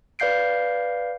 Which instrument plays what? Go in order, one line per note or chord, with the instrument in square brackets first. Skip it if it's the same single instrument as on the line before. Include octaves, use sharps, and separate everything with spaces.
[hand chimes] B4 D5 F5 G6 C7 D7